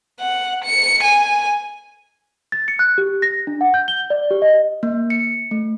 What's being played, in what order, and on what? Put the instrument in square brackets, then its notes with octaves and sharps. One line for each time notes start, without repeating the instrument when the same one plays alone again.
[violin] F#5
C#7
G#5
[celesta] A6
C#7
F#6
G4
A#6
D4
F#5
G6
G7
D5
G4
D#5
[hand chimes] A#3
C#7
A3